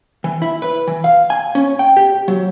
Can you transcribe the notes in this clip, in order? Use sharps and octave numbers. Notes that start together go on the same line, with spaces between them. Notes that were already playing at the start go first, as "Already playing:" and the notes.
E3
E4
B4
E3
F5
G#5
C#4
G5
G4
F#3